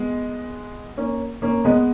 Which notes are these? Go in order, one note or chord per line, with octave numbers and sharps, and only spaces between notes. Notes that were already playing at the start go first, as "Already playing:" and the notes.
Already playing: G#3 B3
A#3 C#4
A#3 C#4
G#3 B3